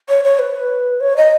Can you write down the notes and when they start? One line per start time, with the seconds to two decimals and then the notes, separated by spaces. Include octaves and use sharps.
0.09 C#5
0.24 C#5
0.39 B4
1.00 C#5
1.17 D#5